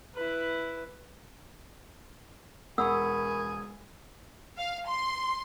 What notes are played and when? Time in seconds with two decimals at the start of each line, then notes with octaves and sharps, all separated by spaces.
0.14 E4 B4
2.78 E1 G#4 A#4 F#5 B5 C#6 D#6 E6
4.58 F5
4.88 C6